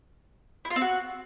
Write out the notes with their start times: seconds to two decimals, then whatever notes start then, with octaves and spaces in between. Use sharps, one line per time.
0.65 E4
0.70 F4
0.76 C4
0.81 F#4